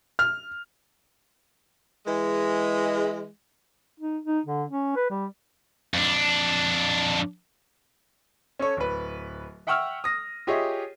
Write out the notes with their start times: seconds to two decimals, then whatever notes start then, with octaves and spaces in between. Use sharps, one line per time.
0.19 F6
2.07 E3 G#3
4.00 D#4
4.25 D#4
4.46 D3
4.68 C#4
4.96 B4
5.10 G3
5.94 F2 D4
8.59 C#4 A4 C#5
8.77 D1 B4
9.67 E5 F#5 G5 C#6 E6 F6
10.04 D#6 A#6
10.47 F4 G4 G#4 C#5 D#5 E5